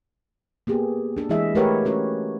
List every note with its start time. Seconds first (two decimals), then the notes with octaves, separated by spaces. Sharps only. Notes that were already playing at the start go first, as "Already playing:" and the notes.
0.67 A#3 B3 G4 G#4
1.17 D4 A4
1.29 E3 G#3 E4 G#4 D#5 E5
1.55 A3 G4 A#4 B4 C#5 F#5
1.85 C#4 F#4 C#5